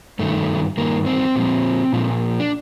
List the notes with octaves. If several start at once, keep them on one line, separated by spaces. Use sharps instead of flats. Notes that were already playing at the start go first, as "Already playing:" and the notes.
G2 D#3 A3
G2 D#3 A#3
C4
A#2 F3
A#2 F3
D4